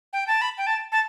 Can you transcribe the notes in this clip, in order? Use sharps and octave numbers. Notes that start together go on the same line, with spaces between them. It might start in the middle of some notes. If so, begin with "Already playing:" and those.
G5
A5
B5
G5
A5
A5